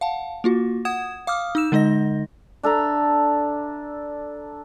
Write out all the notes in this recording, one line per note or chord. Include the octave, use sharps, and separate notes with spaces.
F5 F#5 A5
A#3 F4 F#4
F#5 D#6 G#6 E7
F5 D6 D#6 F6
D#4 E6 E7
D3 G#3 D#4 D#5 A#6
D4 A4 E5 A#5